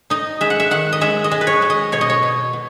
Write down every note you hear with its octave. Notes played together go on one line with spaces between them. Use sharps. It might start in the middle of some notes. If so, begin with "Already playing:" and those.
D#4 D#5
G#3 E5
F#5
E5
D#3 F#5
D#5
G#3 E5
D#5
G#3
B4
C#5
G#3
D#5
B2 C#5
D#5
C#5
B2
B2